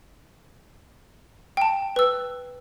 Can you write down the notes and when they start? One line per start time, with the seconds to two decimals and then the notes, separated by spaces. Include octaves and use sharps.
1.57 G5 A5
1.96 B4 E6